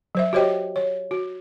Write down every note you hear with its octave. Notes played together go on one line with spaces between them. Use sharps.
F#3 C5 E5
F#4 G4 C5 C#5 D#5 G5
C#5
F#4